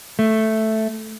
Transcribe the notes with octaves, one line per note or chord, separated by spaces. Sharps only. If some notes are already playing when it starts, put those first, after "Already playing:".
A3